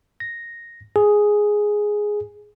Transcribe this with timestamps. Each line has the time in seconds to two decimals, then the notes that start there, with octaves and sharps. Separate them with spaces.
0.20 A#6
0.96 G#4